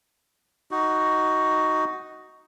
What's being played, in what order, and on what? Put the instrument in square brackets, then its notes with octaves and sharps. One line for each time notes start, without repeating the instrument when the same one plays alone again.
[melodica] D#4 F#4